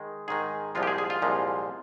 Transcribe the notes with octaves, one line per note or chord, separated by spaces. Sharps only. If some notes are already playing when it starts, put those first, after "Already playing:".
Already playing: D#3 G#3
G#2 D#3 G#3 G#4
C2 A#2 F3 G#3 F4
G4
G#4
G#4
F4
C2 A#2 F3 G#3